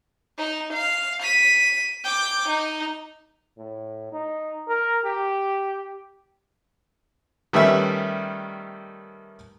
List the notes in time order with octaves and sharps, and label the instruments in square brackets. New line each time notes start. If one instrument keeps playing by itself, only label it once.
[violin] D#4
F5
B6 D#7
G5 D6
D#4
[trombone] A2
D#4
A#4
G4
[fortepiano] D#3 G3 A3 B3 C#4 E5